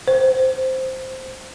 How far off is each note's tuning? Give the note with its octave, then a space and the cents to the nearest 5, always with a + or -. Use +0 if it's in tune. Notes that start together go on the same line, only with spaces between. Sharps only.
C5 +0